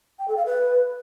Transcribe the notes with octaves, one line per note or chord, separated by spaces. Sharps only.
G5
A4
F5
B4